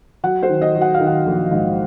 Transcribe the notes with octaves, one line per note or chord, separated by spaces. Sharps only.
F#3 F#5
C5
D#3
D#5
F#3
F#5
F5
D#3
F#5
A#1
G#2